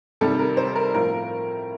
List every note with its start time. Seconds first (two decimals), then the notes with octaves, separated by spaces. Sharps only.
0.21 C3 D#3 G3 A4
0.39 A#4
0.57 C5
0.76 A#4
0.94 A2 F3 A#4